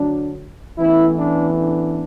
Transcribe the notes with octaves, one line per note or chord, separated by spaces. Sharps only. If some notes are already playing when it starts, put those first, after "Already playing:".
Already playing: D2 D3 F#3 D4
A1 A2 E3 B3 E4
D4
D4